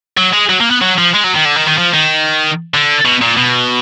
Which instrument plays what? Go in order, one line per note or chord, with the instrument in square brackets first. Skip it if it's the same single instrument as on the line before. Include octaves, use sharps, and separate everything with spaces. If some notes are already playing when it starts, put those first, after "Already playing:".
[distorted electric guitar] F#3
G#3
F#3
A#3
B3
F#3
F3
G#3
F#3
D#3
D3
D#3
D#3
F3
D#3
D3
B2
A#2
B2